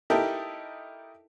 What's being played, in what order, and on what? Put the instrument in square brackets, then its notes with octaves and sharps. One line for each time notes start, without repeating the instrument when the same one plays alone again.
[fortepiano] D#4 E4 G4 A4 A#4